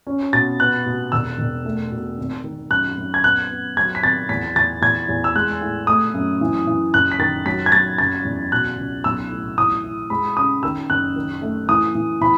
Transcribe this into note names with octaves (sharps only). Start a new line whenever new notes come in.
C#4
B2 A6
B3 F#6
B2
E1 E6
E1
A3
B2
G#1
D#3
F#2 F#6
F#2
G#6
B3 F#6
B3
F#3 G#6
B6
G#1 A6
E2 B6
E2 A6
E2 G#6
E2
E6
G#3 F#6
A2
A3 D#6
F#2
E3
E3
F#1 F#6
B6
D#3 A6
F#3 B6
G#6
F#3 A6
F#1 A6
E2
B2 F#6
C#2
B1 E6
A2
E3 D#6
E4
G#3 B5
C#3 D#6
D#3 E6
F#1 F#6
D#3
A3
E3 D#6
E3
E3 B5